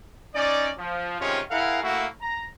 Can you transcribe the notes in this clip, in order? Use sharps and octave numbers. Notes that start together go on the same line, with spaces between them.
C#4 D#4 D5
F3
C3 D#3 G#3 C#4 F4
E4 G#4 A#4 F5 F#5
A3 A#3 E4 F#4
A#5